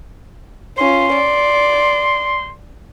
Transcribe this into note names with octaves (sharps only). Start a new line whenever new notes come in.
C#4 F4 C6
D5